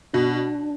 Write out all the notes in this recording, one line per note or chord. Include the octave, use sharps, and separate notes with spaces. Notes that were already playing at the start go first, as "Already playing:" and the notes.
B2 D4